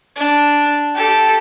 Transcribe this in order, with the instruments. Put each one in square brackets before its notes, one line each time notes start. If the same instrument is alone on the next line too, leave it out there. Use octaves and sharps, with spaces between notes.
[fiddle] D4
G4 A4